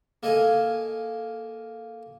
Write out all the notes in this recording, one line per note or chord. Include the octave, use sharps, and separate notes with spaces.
A#3 A4 D#5 F5 G#5